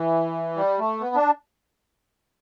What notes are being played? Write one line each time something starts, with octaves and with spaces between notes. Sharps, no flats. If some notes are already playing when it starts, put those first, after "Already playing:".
Already playing: E3
G3
A3
B3
D4